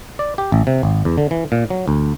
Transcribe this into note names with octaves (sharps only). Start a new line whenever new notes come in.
D5
G4
A1
C3
G#1
E2
D3
E3
A#2
F#3
D2